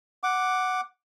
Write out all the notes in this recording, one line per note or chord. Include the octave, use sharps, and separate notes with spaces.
F#5 D6